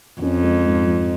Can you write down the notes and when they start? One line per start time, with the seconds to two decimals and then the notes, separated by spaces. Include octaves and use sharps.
0.22 F2 C#4
0.43 G#3
0.66 G#2
0.87 F3